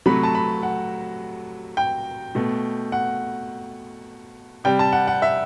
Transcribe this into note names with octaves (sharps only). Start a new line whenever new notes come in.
C3 F#3 A3 B5
A5
B5
F#5
G5
B2 A3
F#5
C3 G3 G5
A5
F#5
F#5
E5